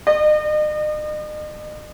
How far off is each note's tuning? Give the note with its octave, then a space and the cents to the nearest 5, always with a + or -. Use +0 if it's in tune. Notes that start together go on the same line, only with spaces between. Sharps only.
D#5 -40